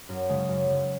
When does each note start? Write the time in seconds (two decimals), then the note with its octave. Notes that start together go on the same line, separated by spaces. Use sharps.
0.09 F#2
0.29 C#3 G#3
0.49 F#2
0.69 C#3 G#3